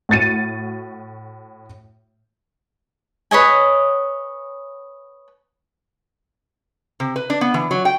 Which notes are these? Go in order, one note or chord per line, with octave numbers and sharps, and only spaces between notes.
A2 F#4 A6 C#7 D#7
B4 C#5 D#5 G#5
C3
B4
D4
B3
E3
F#3
G5